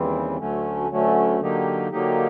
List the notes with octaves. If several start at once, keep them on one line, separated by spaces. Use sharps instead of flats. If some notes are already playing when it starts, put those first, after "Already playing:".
Already playing: D#2 C#3 E3 G3 C4
D2 D3 F#3 A3 C#4
D2 D3 F#3 A3 C#4
D3 F#3 A#3 D#4 G4
D3 F#3 A#3 D#4 G4